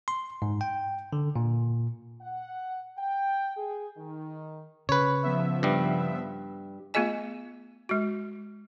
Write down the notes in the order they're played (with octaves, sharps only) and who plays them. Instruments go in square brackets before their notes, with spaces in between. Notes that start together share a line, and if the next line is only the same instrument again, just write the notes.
[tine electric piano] C6
G#2
G5
D3
A#2
[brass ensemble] F#5
G5
G#4
D#3
[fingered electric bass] C#3 [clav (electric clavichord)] B4 C#5
[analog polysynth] F3 B3 E5
[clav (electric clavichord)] G2 G3
[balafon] A3 B3 F4 G#4 D#5 G#5
G#3 F#4